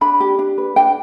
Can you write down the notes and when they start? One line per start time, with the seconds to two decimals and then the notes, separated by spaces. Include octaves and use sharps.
0.01 D4 B5
0.20 G4
0.39 D4
0.58 B4
0.76 D4 G5